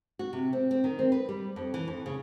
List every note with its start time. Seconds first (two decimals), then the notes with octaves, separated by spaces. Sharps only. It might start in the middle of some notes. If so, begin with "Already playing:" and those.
0.19 F#4
0.33 C3
0.53 C4
0.71 C4
0.84 D#3
0.99 C4
1.12 B4
1.29 G3
1.56 F2
1.74 E3
1.88 F2
2.06 C#3